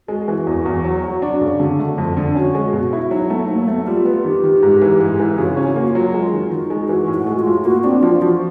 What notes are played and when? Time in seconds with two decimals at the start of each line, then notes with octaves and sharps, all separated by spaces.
0.08 G#3 F#4
0.28 E3
0.47 E2
0.66 E2
0.85 F#3
1.04 F#3
1.22 D4
1.41 C#3
1.60 D3
1.79 A3
1.98 F2
2.17 D3
2.35 C#4 F#4
2.55 G#3
2.73 B2 F#4
2.93 E4
3.11 F#3 D#4
3.30 A3 B3
3.49 F#3 A#3
3.67 A3 B3
3.87 G3 F4
4.05 B3
4.25 D#3 G4
4.44 D#3
4.63 G#2
4.81 E3
5.01 G#2
5.19 E3
5.38 C#3 F#4
5.57 C#4
5.64 F#4
5.76 A#3
5.88 F4
5.95 F#3
6.14 G#3 F4
6.32 D#3
6.51 D#3 F#4
6.70 G#3
6.89 E3 F#4
7.08 A2
7.14 F#4
7.27 G#3
7.40 F4
7.46 A2
7.65 A#3 F#4
7.84 C4 D4
8.02 F3 F4
8.22 F3 F#4